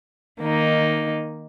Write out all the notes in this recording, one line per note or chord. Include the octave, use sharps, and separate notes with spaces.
D#3 A#3 D#4